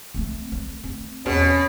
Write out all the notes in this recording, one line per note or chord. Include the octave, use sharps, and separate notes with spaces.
A3 C4
A3
C4
E2 B2 C#4